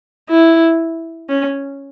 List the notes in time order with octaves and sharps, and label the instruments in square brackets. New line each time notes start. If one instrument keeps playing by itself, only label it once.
[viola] E4
C#4